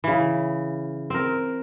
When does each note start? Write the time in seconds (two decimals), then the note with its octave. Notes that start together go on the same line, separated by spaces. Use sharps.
0.04 C#3 E3
1.10 C4 A#4